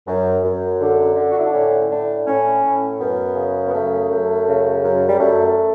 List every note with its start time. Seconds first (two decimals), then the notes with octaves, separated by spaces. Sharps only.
0.07 F#2
0.43 F#2
0.80 D3
1.16 D3
1.31 F#4
1.39 E4
1.46 D4
1.53 A2 C#4
1.89 A2 D4
2.26 A2 C#4
2.63 A2
2.99 F#2 B3
3.36 C#3
3.67 B3
3.73 F#2 A3
4.10 F#2
4.46 C#3
4.83 F#2
5.08 G3
5.19 F#2 A3